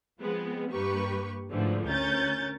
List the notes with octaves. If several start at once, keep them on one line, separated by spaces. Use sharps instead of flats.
F3 G#3 B3 C4
G2 A#3 G4 B4 C#6
G#2 D3 E3 F3 A3
D2 C#4 A#4 G6 A6